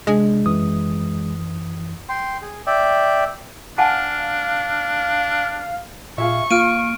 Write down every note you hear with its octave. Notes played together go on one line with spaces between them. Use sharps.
C3 G#3 D4
F#2 E3 D#6
G5 C6
G#4
D5 E5 G5
D4 F5 F#5 G#5 A5
A#2 F4 G#4 E5 C#6
A#3 F4 F6 D7 D#7